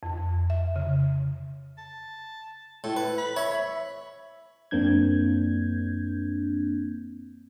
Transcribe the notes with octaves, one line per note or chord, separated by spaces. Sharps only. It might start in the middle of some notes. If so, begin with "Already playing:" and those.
F2
E5
C#3
A5
A2 A4
B4
B5
C#5 E5
F#2 A#3 C4 D4 G6 G#6